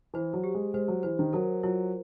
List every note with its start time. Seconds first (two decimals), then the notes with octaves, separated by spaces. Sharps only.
0.14 E3 C5
0.33 F#3
0.44 G4
0.55 G#3
0.74 G#3 C5
0.88 F#3
1.03 E3 C5
1.19 D#3
1.33 F#3 A#4
1.63 F#3 F4